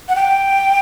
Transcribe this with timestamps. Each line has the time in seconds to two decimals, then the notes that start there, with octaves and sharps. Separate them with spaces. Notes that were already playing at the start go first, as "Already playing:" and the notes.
0.08 F#5
0.15 G5